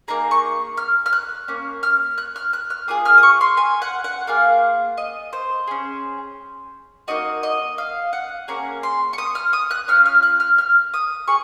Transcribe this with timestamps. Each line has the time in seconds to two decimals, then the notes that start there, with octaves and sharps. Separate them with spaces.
0.08 A#3 D#4 G#4 A#5
0.31 C#6
0.77 F6
1.06 F6
1.13 F#6
1.48 A#3 C#4
1.83 F6
2.18 F#6
2.36 F6
2.53 F#6
2.70 F6
2.88 A#3 F4 G#4 D#6
3.05 F6
3.18 D#6
3.23 C#6
3.41 C6
3.57 G#5
3.82 F#5
4.04 F#5
4.27 A#3 F4 G#4 F5
4.97 D#5
5.33 C5
5.67 C#4 G#4
7.08 A#3 D#4 F#4 D#5
7.43 D#5
7.78 F5
8.13 F#5
8.48 A#3 C#4 G#4 A#5
8.83 C6
9.13 C#6
9.18 D#6
9.35 F6
9.53 D#6
9.71 F#6
9.88 C#4 F4 F6
10.06 F6
10.23 F#6
10.40 F6
10.58 F6
10.94 D#6
11.28 G#4 C#6